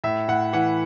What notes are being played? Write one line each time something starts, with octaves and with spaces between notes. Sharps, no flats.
A2 E5
A2 F#5
E3 F#5